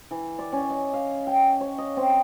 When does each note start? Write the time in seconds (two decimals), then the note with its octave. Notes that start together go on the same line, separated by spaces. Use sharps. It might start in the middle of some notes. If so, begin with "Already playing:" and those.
0.11 E3
0.39 D5
0.53 C#4
0.70 D#5
0.93 F5
1.27 G5
1.60 C#5
1.78 D#5
1.97 C4